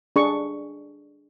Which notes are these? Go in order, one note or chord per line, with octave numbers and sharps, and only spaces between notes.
D4 G#4 C#6